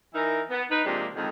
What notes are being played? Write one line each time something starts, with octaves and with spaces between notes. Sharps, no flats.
E3 D#4 E4 A#4
B3
D#4 B4
C3 F3 G#3 A#3 D4 G4
F2 G#2 D3 D#3